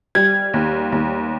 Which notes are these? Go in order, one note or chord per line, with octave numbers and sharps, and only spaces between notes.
G3 G#6
D#2
D#2